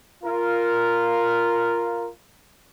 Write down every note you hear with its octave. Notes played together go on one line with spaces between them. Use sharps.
F4 A#4